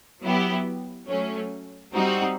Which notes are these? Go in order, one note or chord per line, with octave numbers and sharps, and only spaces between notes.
F#3 B3 E4 G4
F#3 A3 C#4
G3 C4 D#4 F#4